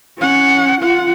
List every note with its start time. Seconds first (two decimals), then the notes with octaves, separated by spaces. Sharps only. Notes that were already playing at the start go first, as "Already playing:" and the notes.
0.18 C#4 F#5
0.81 F4 F#5